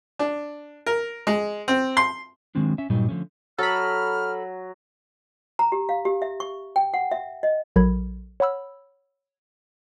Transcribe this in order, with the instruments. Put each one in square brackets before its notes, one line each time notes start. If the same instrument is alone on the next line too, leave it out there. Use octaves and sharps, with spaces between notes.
[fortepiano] D4
A#4
G#3
C4
C6
[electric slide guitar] D#3 F#3 G#3 C4 D4
C#4 E5
G2 A#2 F#3 G3 D#4
D3 F3 A3 C#4
[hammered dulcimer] F#3 [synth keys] A4 B5 [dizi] F6
[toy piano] A#5
G4
F5
G4
E5
C#6
G5
F#5
E5
D#5
[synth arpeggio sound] A#1 F#3 A4 A#4 B5 G#6
C#5 F#5 B5 E6 F6